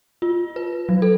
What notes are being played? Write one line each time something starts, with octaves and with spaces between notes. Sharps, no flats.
F4
B4
F#3
A4